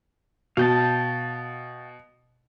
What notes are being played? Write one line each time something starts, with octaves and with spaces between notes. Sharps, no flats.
B2 F5 G5 A5